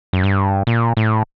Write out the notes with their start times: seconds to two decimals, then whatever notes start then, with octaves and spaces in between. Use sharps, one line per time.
0.13 F#2
0.24 G2
0.67 A#2
0.97 A2